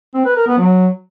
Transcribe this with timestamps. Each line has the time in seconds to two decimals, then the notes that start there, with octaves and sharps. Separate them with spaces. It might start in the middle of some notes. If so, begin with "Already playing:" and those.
0.14 C4
0.25 B4
0.36 A#4
0.47 B3
0.58 F#3